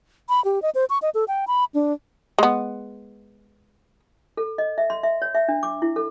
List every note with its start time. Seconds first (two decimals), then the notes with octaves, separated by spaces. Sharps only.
0.29 B5
0.45 G4
0.62 D#5
0.75 C5
0.90 C#6
1.02 D#5
1.15 A4
1.28 G5
1.48 B5
1.74 D4
2.38 G#3 B3
4.37 A4
4.58 D#5
4.78 E5
4.90 C6
5.03 E5
5.22 C#5
5.35 E5
5.48 D4
5.63 D6
5.82 E4
5.96 A4